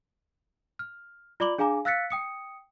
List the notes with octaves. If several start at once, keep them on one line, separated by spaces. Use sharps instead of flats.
F6
F4 D5 B5 D6 F#7 G7
D4 G#4 F5 G#5 A#5 D6
F5 E6 F#6 A6 B6 C#7
G5 D#6 C#7